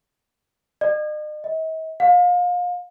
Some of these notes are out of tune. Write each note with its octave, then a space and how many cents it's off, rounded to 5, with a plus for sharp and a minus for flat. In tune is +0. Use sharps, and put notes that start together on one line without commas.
D#5 -45
D#5 +45
F5 +30